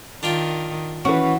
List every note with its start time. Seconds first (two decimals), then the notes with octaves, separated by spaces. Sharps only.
0.23 D#3 D4 F4 G5
1.05 E3 C#4 F#4 B4